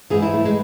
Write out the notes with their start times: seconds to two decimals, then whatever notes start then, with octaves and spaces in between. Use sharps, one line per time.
0.10 G#2 E3 G#4
0.22 E4
0.34 A3
0.45 G#3